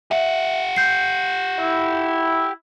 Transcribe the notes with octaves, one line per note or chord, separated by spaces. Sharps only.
G4 E5 F#5
G6 C7
E4